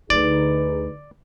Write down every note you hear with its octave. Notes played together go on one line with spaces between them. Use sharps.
D2 D3 D#4 G#4 B4 D5